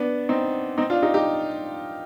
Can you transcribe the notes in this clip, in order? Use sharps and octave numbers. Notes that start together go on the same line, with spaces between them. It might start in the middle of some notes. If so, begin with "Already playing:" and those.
Already playing: B3 D4
C4 D#4
C4 D#4
D4 F4
D#4 G4
D#4 G4